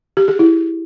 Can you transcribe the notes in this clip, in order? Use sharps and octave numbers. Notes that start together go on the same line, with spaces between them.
G4
G#4
E4